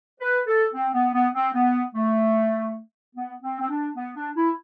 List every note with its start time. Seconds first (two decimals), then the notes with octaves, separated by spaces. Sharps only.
0.20 B4
0.47 A4
0.74 C4
0.94 B3
1.14 B3
1.34 C4
1.54 B3
1.95 A3
3.16 B3
3.43 C4
3.60 C4
3.70 D4
3.96 B3
4.16 D4
4.36 E4